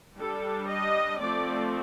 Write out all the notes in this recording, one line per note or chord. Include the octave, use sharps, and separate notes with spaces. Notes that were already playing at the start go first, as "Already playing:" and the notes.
G3 D4 A4
D#5
F3 A3 C4 D5